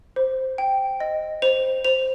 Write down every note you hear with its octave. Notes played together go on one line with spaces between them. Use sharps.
C5
G5
D#5
C5 F7
C5 F7